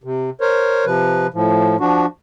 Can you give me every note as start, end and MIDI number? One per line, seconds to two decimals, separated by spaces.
0.04 0.30 48
0.41 0.85 70
0.41 0.85 72
0.41 0.85 73
0.85 1.27 48
0.85 1.27 53
0.85 1.27 71
1.34 1.76 45
1.34 1.76 53
1.80 2.06 53
1.80 2.06 62
1.80 2.06 66